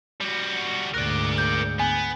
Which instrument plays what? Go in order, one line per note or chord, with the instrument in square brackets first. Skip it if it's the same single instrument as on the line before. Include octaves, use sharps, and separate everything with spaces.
[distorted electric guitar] G3 F#4
[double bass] D2 G#2 [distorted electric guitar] A#4 D5 [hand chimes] F#6
[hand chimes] G6
[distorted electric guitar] B3 [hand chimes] G#5